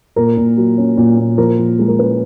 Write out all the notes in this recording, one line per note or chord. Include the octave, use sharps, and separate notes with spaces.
A#2 A#4
A#2
F#3
C#4
A#2
A#2
F3 A#4
F3
G#3
A#4
C#4 B4